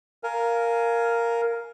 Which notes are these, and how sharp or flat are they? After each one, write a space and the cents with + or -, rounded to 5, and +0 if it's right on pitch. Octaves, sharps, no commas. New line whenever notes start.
A#4 +0 F5 +0 G#5 +15